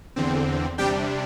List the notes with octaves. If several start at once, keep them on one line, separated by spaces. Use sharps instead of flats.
E2 D3 C4
C3 G3 D4 G4 G5